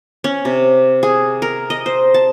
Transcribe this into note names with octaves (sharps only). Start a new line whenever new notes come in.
C#4
C3
G#4
A#4
D#5
C5
A5